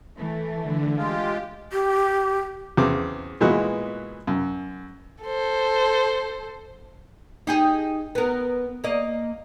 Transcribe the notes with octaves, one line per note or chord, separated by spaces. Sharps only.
E3 A3
D3
G#3 F4 G4
G4
E2 C#3 C4 D6
A#2 E3 G#3 B3 F#4
F#2
A4 C5
D#4 G4 G#4
B3 A#4
A#3 D#5